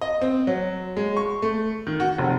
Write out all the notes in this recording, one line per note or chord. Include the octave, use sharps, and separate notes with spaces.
D#5
C4
F#3
G#3
C#6
A3
D#3
F#4
F1